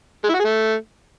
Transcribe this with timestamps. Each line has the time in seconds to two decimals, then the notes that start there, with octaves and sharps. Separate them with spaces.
0.24 G#3
0.29 E4
0.34 F#4
0.39 G#4
0.45 A3